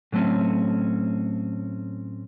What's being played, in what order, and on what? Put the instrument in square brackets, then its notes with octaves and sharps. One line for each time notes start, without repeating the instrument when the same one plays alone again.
[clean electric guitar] A2 F#3 A3 C4 C#4